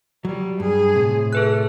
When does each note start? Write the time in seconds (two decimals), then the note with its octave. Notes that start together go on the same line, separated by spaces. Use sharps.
0.25 F#3 G3
0.60 G2 G#4
0.95 A2 C3
1.33 A3 G#4 B4 F#6